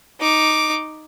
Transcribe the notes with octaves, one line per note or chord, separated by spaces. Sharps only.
D#4 D6